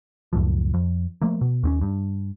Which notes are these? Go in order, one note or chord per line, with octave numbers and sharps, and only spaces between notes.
C#2 F#2 A2 F3
F2
F3 A3 A#3
B2
D#2 C4 C#4
G2